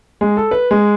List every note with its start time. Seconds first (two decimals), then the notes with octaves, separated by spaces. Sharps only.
0.21 G#3
0.37 A4
0.51 B4
0.71 G#3